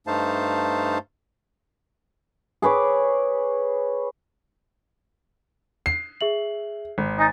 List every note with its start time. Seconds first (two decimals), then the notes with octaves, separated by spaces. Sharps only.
0.07 G2 A3 D#4 C5 F5 A5
2.62 G#4 B4 C#5 D6
5.86 C7
6.21 G#4 E5 F#7
6.98 G#1
7.19 D#4 G#5 A6